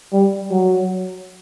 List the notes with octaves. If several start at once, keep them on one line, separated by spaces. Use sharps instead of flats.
G3
F#3